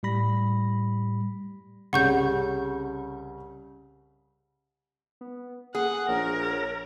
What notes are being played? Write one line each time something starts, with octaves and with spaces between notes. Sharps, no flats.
A2 G3 B5 A#6
C2 C#3 F#5 C#6 G6
B3
A#3 G#4 F#5
A#1 A#4 C#5